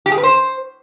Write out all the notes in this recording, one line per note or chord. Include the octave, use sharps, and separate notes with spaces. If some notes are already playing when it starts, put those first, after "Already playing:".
G4
G#4
B4
C5